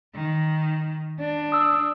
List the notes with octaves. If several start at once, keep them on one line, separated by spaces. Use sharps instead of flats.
D#3
D4
D#6 E6